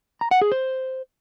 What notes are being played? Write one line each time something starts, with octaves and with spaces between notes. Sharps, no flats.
A#5
F#5
G#4
C5